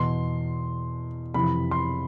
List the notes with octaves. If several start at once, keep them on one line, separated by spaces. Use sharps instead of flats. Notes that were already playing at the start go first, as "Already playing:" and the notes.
Already playing: E2 B2 C6
F2 C3 E3 B5
C6